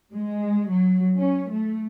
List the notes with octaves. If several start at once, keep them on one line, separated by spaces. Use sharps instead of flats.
G#3
F#3
C#4
A3